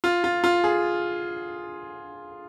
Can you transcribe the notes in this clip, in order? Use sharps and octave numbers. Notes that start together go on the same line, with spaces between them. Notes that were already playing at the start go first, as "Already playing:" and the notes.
F4
F4
F4
G#4